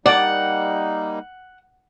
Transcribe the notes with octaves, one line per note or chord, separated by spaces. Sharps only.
G3 A#3 D#4 D5 F#5